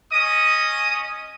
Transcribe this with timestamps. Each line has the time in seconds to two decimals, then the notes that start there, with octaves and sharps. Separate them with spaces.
0.12 C#4 D#5 D#6